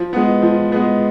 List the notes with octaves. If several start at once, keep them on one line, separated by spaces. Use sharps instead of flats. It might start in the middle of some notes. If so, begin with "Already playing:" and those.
Already playing: F3
G#3 B3
F3
G#3 B3